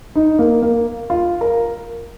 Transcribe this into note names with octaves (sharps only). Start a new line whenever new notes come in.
D#4
A#3
A#3
F4
A#4